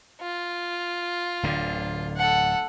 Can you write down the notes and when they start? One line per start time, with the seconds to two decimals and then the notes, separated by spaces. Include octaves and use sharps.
0.21 F4
1.43 D1 D3
2.17 A4 F#5